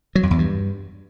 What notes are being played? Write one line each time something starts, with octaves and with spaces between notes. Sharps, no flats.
F#3
F2
E2
G2